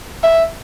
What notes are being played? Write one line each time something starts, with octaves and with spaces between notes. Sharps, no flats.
E5